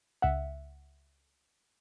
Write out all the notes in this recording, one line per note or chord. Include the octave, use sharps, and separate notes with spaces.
C#2 E5 F#5